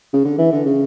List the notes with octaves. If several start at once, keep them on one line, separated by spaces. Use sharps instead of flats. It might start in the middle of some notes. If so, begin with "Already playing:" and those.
C#3
D3
E3
D3
C#3